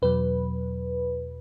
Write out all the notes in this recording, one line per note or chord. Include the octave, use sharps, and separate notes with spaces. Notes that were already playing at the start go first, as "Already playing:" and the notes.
E2 B2 F#3 B4